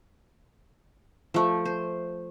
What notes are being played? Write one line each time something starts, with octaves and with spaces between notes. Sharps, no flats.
F3 A3
C5